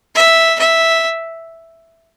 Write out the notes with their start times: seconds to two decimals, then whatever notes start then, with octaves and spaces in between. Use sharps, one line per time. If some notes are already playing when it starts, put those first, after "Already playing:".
0.15 E5
0.59 E5